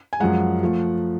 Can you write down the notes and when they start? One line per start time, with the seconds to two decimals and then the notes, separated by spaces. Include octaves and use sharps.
0.13 G#5
0.20 F#2 F3 G#3 F#5
0.63 F3 A3